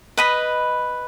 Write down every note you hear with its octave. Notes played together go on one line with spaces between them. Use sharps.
B4 D#5 B5